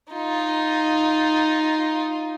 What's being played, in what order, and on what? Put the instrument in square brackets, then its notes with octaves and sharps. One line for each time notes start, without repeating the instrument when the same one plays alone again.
[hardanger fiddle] D#4 F4